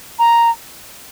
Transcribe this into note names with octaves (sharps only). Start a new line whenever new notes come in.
A#5